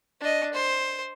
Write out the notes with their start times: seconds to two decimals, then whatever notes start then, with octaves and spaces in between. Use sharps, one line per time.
0.20 D4 D#5
0.54 C5